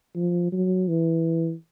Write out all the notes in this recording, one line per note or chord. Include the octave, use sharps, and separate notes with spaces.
F3
F#3
E3